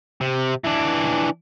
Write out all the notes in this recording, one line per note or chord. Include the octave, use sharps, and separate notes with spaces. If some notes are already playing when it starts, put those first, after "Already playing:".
C3
E3 D4